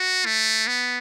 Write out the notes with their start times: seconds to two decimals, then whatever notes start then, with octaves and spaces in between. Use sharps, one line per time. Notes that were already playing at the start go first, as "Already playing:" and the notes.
Already playing: F#4
0.26 A3
0.67 B3